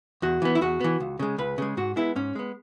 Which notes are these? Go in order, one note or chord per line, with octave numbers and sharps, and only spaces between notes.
E2 F#4
E3 B3
E4
E2 F#4
E3 B3
C#2
C#3 G#3
C#2 B4
C#3 G#3
G#2 F#4
G#3 B3 E4
G#2 C#4
G#3 B3